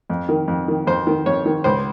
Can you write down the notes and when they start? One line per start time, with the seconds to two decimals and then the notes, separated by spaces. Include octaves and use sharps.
0.10 F2
0.29 D#3
0.48 F2
0.68 D#3
0.87 F2 C5
1.07 D#3
1.26 F2 C#5
1.46 D#3
1.64 C#2 C5